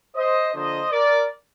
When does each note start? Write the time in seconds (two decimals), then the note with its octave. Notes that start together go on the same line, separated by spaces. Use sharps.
0.16 C5 D#5
0.54 D3 F3 A#3 D4 C5 D#5
0.91 A#4 D5